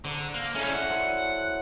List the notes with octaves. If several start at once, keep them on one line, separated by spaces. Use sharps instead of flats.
D3 C5 A5 A#5
A#3
C#4 D#4 E4 A4 D5
F#5
F#3 C5 A5